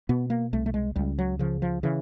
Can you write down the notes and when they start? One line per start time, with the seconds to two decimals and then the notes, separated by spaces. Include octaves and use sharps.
0.09 B2 B3
0.30 A#3
0.53 C2 A3
0.66 A3
0.74 G#3
0.96 C#2 G3
1.19 F#3
1.39 C#3 F3
1.62 F3
1.83 C#3 E3